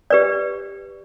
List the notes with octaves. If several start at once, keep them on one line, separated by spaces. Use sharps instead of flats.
G4 B4 D5